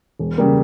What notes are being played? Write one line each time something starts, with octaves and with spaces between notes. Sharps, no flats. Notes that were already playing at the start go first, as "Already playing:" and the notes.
E1
C#3 G3 A#3